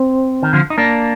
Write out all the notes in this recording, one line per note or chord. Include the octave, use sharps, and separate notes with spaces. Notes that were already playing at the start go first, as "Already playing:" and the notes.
Already playing: C4
D#3
D3 F3
D#4
A#3 D4